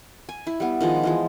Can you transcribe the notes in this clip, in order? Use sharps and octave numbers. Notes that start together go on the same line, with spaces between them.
G#5
E4
G3 B3
D#3 F3 G#3
E3 F3 G#3